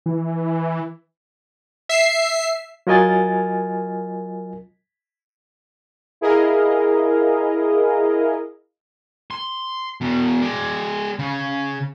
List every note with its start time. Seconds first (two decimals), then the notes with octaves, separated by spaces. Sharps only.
0.06 E3
1.89 E5 C7
2.87 F#3 F4 A#4 D#5 G#5 A6
6.21 E4 G#4 A#4 D#5 F5
9.31 C6
10.01 E2 B2
10.42 G#3 D5
11.19 C#3